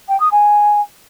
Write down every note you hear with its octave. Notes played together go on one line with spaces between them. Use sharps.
G5
D#6
G#5